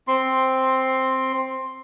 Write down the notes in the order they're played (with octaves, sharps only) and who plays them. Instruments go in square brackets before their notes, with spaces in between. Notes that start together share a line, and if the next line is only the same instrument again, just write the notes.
[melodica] C4 C6